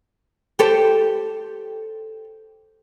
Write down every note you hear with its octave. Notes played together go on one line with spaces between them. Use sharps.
G4 A4 C5